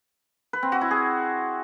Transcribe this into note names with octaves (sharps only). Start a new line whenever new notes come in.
B4
C4
F#4
E4
G#4